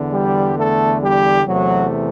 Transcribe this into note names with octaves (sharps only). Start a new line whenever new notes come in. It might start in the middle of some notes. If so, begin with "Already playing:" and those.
Already playing: E2 D3 B3
G3 G4
A3 A4
G3 G4
E2 C3 E3 F#3 A3 F#4